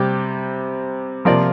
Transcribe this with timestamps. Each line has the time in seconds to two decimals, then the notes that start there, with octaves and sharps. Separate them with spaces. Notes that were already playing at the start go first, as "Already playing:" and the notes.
Already playing: C3 G3 G4
1.25 C3 F3 A#3 F4 A#4 D5